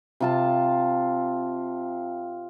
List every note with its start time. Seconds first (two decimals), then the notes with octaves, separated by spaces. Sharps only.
0.20 C3 F4 A5